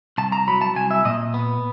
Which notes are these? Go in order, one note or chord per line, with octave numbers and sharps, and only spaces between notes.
C2 A5
A#5
F#3 B5
A5
C2 G#5
E5
A#2 D#5
B3